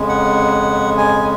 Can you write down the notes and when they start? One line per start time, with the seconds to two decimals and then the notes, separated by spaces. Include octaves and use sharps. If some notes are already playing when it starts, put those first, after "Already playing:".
Already playing: F2 C#3 G#3
0.09 F#5
0.98 G#5